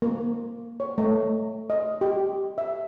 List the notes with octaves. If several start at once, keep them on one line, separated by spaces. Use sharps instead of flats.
A#3
C#5
A3
D#5
G4
E5